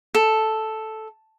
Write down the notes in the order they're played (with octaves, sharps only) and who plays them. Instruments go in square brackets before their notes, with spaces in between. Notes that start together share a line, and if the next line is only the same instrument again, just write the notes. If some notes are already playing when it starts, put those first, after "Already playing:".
[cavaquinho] A4